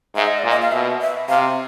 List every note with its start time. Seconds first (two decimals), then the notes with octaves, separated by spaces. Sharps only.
0.15 G#2 E5
0.27 D#5
0.39 D5
0.44 A#2
0.49 D#5
0.62 F5
0.72 B2 E5
1.01 E5
1.29 C3 F5